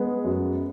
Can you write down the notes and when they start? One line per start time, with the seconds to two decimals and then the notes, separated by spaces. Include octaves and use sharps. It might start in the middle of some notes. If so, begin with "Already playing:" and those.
Already playing: G#3 B3
0.24 F#2